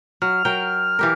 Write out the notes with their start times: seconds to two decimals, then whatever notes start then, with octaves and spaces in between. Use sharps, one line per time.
0.22 F#3 F6
0.45 F#3 A#4 G5
0.99 E3 G4 A#4